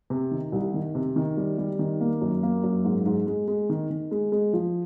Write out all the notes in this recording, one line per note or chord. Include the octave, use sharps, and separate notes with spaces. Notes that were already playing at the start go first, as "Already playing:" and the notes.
C3
D#3
C2
D#3
C3
D#3
G3
G3
D#3
A#3
F#2
A#3
F#2
G#2
G#2
G#3
G#3
D#3
D#3
G#3
G#3
F3